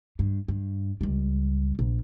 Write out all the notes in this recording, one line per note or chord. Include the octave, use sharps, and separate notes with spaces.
G2
G2
C#2 G3
A#1